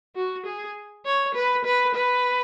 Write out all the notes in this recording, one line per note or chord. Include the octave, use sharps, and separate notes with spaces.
F#4
G#4
C#5
B4
B4
B4